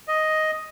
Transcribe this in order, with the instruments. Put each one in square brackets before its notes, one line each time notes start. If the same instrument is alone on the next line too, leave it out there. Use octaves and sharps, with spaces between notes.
[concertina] D#5